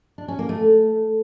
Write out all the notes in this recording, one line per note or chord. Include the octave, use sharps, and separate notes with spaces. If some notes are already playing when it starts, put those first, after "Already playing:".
D4
C#4
A#3
A3